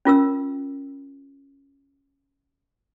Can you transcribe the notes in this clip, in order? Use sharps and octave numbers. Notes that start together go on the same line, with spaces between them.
C#4 F4 A#4 E6